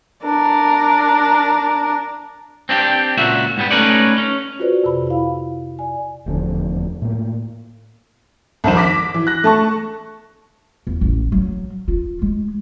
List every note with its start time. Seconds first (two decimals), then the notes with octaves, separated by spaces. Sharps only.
0.23 D4 A#4
2.69 C4 D4 F#4 G4
3.17 C#2 A#2 F#4 E5
3.57 G#2 G3 B3
3.71 A3 C#4 D#4 B4 C#5 D5
4.18 C#4
4.59 F4 F#4 G#4 B4 C5 D5
4.84 F2 C3 C5 B5
5.07 E4 F5
5.79 D5 G#5
6.26 F1 E2 D3 F3
7.02 A2 A#3
8.64 C2 F2 D#3 C5 E7
8.77 D6 A#6 B6
9.14 E3
9.27 F#6 A#6
9.44 A3 A5 C#6
10.87 E2
11.01 A1
11.32 F#3
11.88 F4
12.22 G#3